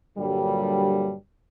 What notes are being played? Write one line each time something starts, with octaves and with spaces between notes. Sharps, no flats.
G2 A#2 D3 F#3 G3